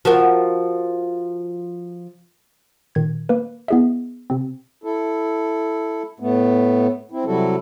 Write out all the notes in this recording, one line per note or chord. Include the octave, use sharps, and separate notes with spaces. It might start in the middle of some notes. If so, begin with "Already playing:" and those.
F3 F#4 A#4
A#2 D#3 G#6
A#3 B4
B3 E4 G#4 D#5 E5
C3 C4
E4 A4
A2 A3 B3
C4 E4
C3 F#3 G3 E4 F#4 A4